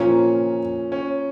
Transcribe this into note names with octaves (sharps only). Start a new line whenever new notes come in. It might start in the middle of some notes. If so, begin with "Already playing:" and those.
Already playing: A#2 F3 A#3 C#4
C#4